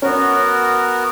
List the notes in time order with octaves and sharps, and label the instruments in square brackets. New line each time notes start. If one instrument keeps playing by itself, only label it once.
[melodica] B3 F#4 A#4 [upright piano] C#4